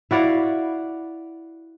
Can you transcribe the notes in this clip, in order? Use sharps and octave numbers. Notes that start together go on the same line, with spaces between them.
E4 F#4 D5 F5